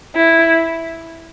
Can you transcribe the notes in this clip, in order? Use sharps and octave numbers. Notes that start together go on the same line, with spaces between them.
E4